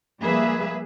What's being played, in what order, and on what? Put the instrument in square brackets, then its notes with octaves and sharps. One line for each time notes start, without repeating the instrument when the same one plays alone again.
[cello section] F3 G3 A#3 G#4 B4 E5